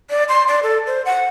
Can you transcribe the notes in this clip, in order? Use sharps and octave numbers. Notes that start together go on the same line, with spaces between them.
D5
C6
D5
A4
C5
F#5